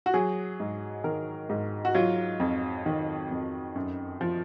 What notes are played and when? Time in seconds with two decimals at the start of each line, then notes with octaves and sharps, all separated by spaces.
0.06 F#4
0.14 F#3 G#4
0.60 G#2
1.04 D#3 A#4
1.49 G#2
1.85 F#4
1.94 F#3 F4
2.40 F2
2.86 D#3
3.31 F2
3.75 F#2
4.21 F3